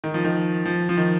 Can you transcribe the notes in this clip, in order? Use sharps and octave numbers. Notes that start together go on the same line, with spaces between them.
D#3
F3
D#3
F3
F3
D#3